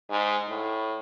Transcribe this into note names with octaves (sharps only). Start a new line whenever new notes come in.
G#2
A2